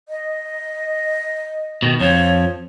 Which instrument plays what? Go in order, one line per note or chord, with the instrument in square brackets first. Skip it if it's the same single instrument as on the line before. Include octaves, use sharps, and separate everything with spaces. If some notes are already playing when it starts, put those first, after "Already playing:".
[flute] D#5
[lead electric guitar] B2 D#3
[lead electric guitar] F2 F3 [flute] C#5